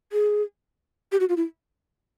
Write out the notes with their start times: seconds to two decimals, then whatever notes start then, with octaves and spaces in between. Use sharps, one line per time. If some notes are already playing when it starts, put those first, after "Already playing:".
0.12 G#4
1.12 G4
1.20 F#4
1.29 F4
1.37 E4